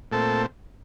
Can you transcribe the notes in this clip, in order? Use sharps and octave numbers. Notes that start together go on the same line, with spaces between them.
A#2 A3 C4 A4